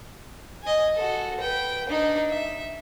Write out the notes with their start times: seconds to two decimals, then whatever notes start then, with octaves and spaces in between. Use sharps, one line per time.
0.62 D#5 G#5
0.95 F#4 A4
1.40 B4 G5
1.88 D4 D#4
2.30 E5